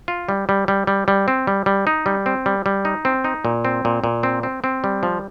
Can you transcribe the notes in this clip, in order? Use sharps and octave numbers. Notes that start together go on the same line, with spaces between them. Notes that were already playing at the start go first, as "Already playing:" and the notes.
F4
G3
G3
G3
G3
G3
C4
G3
G3
D#4
G3
C4
G3
G3
D#4
C4
D#4
A#2
C4
A#2
A#2
C4
C4
C4
G3
F3